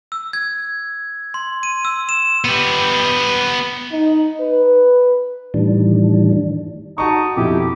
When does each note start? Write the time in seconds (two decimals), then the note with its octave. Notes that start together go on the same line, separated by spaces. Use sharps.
0.12 E6
0.33 G#6
1.34 C6
1.63 D#7
1.85 E6
2.09 E7
2.45 B3 G4
3.92 D#4
4.41 B4
5.54 A2 D#3 E3 G3 D4
6.98 D#4 F#4 A5 C#6
7.36 F2 B2 E4 G4